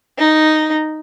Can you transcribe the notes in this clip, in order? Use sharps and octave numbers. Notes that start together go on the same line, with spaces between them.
D#4